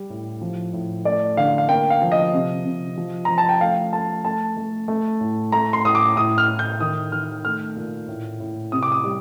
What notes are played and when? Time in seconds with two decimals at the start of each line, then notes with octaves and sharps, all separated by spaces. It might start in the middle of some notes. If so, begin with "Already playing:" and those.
Already playing: G3
0.10 A2
0.41 F3
0.73 A2
1.05 A3 D5
1.37 D3 F5
1.58 F5
1.69 A#3 G5
1.90 F5
2.02 F3
2.12 D#5
2.33 C3
2.65 C3
2.98 F3
3.25 F3 A#5
3.38 A5
3.49 G5
3.61 A3 F5
3.93 A3 A5
4.25 A3 A5
4.57 A3
4.88 A3
5.21 A2
5.52 A3 A#5
5.73 C6
5.85 A2 D#6
5.95 D6
6.16 A2 D#6
6.38 F6
6.48 A2
6.59 G6
6.80 D#3 D#6
7.12 D#3 F6
7.45 A3 F6
7.76 A#2
8.08 A2
8.40 A2
8.72 C3 D#6
8.83 D6
8.92 D#6
9.04 G3